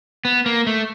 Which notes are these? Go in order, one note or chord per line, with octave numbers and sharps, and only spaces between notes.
B3
A#3
A3